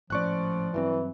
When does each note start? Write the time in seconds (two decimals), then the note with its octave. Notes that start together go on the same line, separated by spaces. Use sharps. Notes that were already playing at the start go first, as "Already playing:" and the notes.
0.10 G#1 A2 F3 C#4 D5 C#6 F#6
0.74 G2 E3 F#3 C4